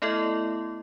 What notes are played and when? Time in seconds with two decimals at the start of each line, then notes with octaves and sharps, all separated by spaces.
0.02 A3 B3 E4 A4 D#5